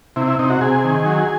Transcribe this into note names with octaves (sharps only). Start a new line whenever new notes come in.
C3 E4
E4
C3 D#4
F#4
C3 G#4
D#3
F#3